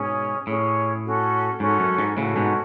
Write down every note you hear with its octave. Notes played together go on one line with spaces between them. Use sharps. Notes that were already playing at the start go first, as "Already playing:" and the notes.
Already playing: G#2 B2 C#4 G#4 C#5
A2 C#4 G#4 C#5
C#4 F#4 A4
G#2 C#4 F#4 A4
F#2
G#2
A2 C#3 C#4 F#4 A4
G#2 B2